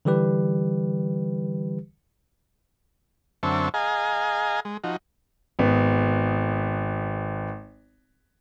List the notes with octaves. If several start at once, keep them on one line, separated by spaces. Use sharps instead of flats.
D3 E3 G3 G4 B4
F#2 D3 C4 E5 A5 C#6
G#4 D#5 F5 G#5 A#5
G#3
F3 D#4 F#4
G#1 B3